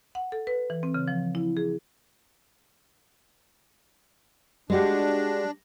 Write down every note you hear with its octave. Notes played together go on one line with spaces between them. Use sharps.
F#5
A4
B4
E3
C4
C#3
F3
E4
G#4
G#3 D4 F#4 G4